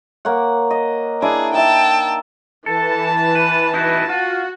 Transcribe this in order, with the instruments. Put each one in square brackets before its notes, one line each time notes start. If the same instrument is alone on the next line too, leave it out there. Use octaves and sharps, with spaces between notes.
[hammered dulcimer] A#3 C#5 F#5
D#5
[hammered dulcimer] D4 E4 D5 [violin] G#4
[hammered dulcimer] D#4 E5 [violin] G5 A5
[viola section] E3 A5 [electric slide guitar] A4
[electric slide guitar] B4
D#4 E4 F#4
[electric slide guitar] F4 [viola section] F#4